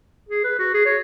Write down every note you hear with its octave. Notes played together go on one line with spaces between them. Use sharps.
G#4
B4
F#4
G#4
C#5